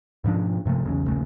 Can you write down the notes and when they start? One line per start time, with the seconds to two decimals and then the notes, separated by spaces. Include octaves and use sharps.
0.24 G#2 B2 F3 D4
0.65 G2 C3 F3 A3
0.84 E1 B1 E2 C#3
1.08 A#1 D#2 C#3 A3